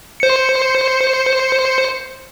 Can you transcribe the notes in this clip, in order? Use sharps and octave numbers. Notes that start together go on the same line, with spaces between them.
C5 C#7